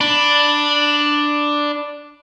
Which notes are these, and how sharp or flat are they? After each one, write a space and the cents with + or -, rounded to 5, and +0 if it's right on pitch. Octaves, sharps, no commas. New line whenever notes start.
D4 +5 B5 +0